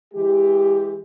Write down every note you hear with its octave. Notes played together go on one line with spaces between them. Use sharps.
E3 G#3 G4